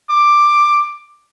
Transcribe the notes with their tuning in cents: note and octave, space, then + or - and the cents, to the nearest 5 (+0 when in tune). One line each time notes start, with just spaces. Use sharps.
D6 +10